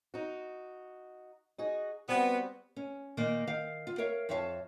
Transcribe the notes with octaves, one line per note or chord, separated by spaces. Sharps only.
D#4 F#4
D#4 F#4 G#4
G3 B3 C4 F#4
C#4
A#2 D#3 A#3
D#3 F5
F4
A#4 C#5 E5 F5
F2 C#5 E5 F5 G5 A5